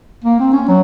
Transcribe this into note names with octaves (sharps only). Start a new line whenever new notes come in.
A#3
C4
C#4
F#3